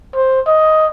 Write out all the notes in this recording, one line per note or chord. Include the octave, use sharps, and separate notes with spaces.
C5
D#5